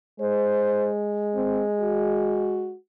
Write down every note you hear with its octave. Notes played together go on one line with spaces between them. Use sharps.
G#3 C5
C4
F#4